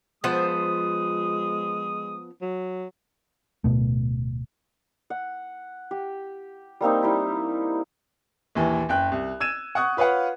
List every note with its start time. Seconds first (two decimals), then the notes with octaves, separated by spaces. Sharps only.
0.24 F3 G#3 B3 C5 D#6
2.41 F#3
3.64 D1 D#2 B2 A3
5.10 F#5
5.91 G4
6.81 G3 A#3 C4 D#4
7.03 G3 D#4 E4
8.55 A#1 D#2 E3
8.89 F#1 G5 F#6
9.12 C2
9.40 E6 G#6 D#7 E7
9.75 F#5 C#6 D#6 F#6
9.97 F4 B4 C#5 F5 F#5